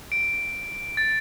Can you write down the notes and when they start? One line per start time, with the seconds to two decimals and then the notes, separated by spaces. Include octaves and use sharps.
0.12 D7
0.97 A6